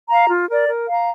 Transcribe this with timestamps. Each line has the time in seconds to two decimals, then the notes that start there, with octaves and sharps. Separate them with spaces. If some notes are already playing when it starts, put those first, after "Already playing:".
0.09 F5 A#5
0.28 F4
0.49 A#4 D5
0.68 A#4
0.89 F5 A#5